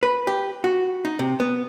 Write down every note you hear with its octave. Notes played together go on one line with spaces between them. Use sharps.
B4
G4
F#4
D#4
C3
B3